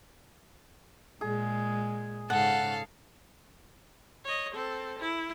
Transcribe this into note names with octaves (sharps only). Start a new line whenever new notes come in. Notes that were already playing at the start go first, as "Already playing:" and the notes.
A#2 G#3 G#4
G#2 C#3 A4 F5 F#5
C#5 D#5
C4 A4
E4